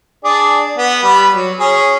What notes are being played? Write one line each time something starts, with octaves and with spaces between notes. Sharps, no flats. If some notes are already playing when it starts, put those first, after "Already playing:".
D4 G#4 D5
B3
G3 B4 B5
F#3
C#4 G#4